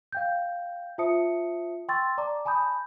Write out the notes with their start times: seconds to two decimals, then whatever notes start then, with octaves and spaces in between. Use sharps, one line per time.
0.12 F5 G5 G6
0.98 F4 C5 E5 A5 D#6 C#7
1.88 G5 C6 C#6 E6 A6
2.18 D5 A5 A#5 D6
2.45 G#5 A5 B5 D#6 G6